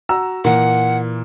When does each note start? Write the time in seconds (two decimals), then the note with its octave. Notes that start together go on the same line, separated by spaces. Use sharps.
0.09 F#4 A#5 E6
0.45 A#2 E3 A#4 F#5